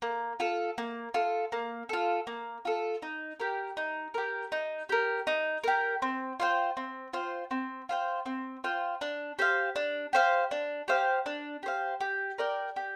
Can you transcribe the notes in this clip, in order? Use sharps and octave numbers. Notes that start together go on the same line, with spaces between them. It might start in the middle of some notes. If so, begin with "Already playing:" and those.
A#3
F4 A4
A#3
F4 A4
A#3
F4 A4
A#3
F4 A4
D#4
G4 A#4
D#4
G4 A#4
D#4
G4 A#4
D#4
G4 A#4
C4
F4 C5 G5
C4
F4 C5 G5
C4
F4 C5 G5
C4
F4 C5 G5
D4
G4 C5 F5
D4
G4 C5 F5
D4
G4 C5 F5
D4
G4 C5 F5
G4
A#4 D5 G5
G4